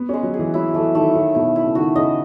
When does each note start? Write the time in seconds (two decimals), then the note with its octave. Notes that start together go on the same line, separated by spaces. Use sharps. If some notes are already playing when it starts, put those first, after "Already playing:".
Already playing: B3
0.09 G#3 C#4
0.23 F#3
0.34 G#4
0.39 E3
0.54 F#3 E4
0.74 E3 A3
0.95 D#3 A3
1.15 D#3 F#3
1.35 B2 E4
1.56 E4
1.65 C#3
1.75 D#3 F#4
1.96 C#3 D#5